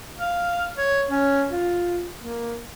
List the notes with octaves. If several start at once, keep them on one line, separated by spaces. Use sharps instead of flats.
F5
C#5
C#4
F4
A#3